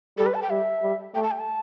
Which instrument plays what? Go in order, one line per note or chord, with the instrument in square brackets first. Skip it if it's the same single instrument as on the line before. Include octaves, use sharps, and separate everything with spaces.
[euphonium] G3 [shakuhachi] A4
[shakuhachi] B4
A5
G5
[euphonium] G3 [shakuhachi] E5
[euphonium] G3
[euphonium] A3 [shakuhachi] G5
[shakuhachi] A5
G5
A5